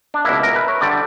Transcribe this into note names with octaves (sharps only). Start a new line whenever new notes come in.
D4
C#2 B2 A#3 E4
A#4
B4
C#5
D3 G3 D5